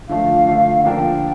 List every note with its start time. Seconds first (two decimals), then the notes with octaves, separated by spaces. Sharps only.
0.09 D3 F3 A3 F5
0.46 D3 F3 A3
0.79 F#5
0.84 D3 F3 A#3 D4 G5